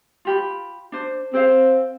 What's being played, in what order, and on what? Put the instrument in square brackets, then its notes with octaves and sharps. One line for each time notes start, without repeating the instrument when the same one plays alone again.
[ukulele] F4 G4 B5
D4 C5
[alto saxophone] C4 [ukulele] G#4 C5 F5